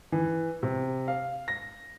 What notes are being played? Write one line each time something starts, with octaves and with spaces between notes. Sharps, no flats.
E3
C3
F5
A#6